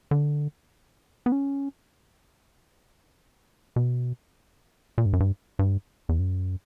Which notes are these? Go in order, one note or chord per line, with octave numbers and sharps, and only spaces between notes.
D3
B3
C#4
B2
A#2
G2
F#2
G2
G2
E2
F#2